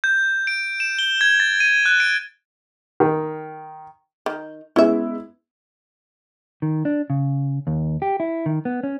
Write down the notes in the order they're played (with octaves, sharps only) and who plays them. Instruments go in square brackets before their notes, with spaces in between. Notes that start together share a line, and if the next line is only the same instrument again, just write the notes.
[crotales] G6
D7
E7
G7
G#6
A6
D#7
F#6
D7
[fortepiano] D#3
[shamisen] D#3
[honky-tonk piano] G#3 B3 E4 [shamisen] C#4 E5
[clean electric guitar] D#3
D4
C#3
D#2
G4
E4
D#3
B3
C#4